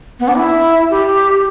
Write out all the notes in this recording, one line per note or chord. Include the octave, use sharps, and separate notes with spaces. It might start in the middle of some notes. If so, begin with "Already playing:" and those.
B3
D4
E4
G4